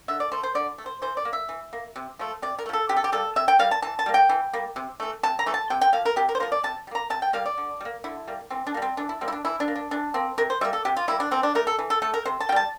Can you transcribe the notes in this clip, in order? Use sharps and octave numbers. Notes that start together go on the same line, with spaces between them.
D3 E5
D5
A3 C5
C5
D3 D5
A3
C5
E3 C5
D5
A#3
E5
E3
A#3
C3
F3 A3
C3 D5
A#4
A3
F3 A4
C3 G4
A4
G4
G3 A#3 A4
C3 E5
G5
G3 A#3 F5
A5
E3 A5
A5
G3 A#3
G5
E3
G3 A#3
C3
E3 A3
C3 A5
A#5
E3 A3
A5
C3 G5
G5
F3 A#3 F5
A#4
C3 G4
A#4
C5
F3 A#3 A#4
D5
C3 A5
G3
A#3 A#5
C3 A5
G5
G3 A#3 F5
D5
D3
G3
A#3
D3 E4
G3 A#3
E3 C4
D4
A#3
G3 C4
E3 D4
E4
G3 A#3 C4
E4
D4
E3 E4
D4
A#3
D4
E3 D4
A#3 C4
C3 A#4
C5
G3 A#3 E5
A4
C3 G4
F4
G3 A#3 E4
D4
E3 C4
D4
A3 A#4
A4
E3
A4
A3 A4
A#4
C3 C5
A5
A#3 G5
G3 A5